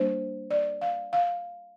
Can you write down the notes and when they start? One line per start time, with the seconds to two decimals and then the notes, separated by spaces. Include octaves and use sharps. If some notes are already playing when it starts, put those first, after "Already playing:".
Already playing: G3 A#3 D4 C5
0.51 D5
0.81 F5
1.13 F5